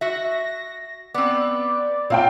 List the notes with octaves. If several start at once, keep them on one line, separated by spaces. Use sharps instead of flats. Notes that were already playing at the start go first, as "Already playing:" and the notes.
F#4 E5 A#6
B3 C4 D5
A#2 C4 C#5 F5 G5